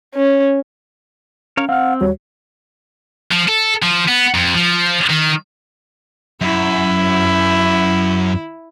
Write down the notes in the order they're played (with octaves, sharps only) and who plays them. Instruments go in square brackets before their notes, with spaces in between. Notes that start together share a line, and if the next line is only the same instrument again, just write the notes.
[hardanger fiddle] C#4
[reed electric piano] C#4 [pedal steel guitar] A#4 C#5 F5
[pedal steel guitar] C4 [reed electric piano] F5 F6 [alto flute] F#5
[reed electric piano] D#2 G3 F#4 [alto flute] C#5
[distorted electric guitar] F3
A4
F3
B3
F2
F3
D#3
[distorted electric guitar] F#2 [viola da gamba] E4